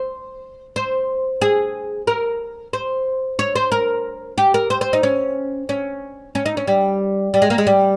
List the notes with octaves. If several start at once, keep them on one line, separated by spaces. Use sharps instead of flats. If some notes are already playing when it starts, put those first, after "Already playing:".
Already playing: C5
C5
G#4
A#4
C5
C#5
C5
A#4
G4
A#4
C5
C5
D#4
C#4
C#4
C#4
D#4
C#4
G3
G3
G#3
A#3
G#3
G3